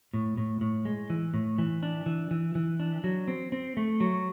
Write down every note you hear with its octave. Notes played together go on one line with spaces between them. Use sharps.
A2
A2
A2
G#3
E3
A2
E3
D4
E3
E3
E3
D4
F#3
C4
C4
A3
F#3